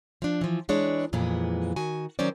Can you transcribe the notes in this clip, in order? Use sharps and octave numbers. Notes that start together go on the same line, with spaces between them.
F3 D4
E3 F3
E3 G#3 D4 C#5
F2 A#2 E3 G#3 B3
D#3 F#4 G#5
D#3 F#3 C#4 C5 D5